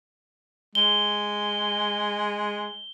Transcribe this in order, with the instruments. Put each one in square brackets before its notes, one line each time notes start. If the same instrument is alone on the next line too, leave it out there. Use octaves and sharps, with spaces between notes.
[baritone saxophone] G#3 [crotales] G7